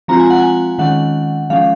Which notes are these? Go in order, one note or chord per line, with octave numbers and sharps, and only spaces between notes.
F3 G#3 C4 F4 A#5
G#5
F#5
G#5
D#3 G#3 C#4 F#5
F3 G#3 C#4 F5